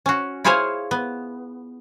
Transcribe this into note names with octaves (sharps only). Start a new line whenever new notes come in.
C#4 F#4
E4 F4 G#4 C5 C#5 F5
B3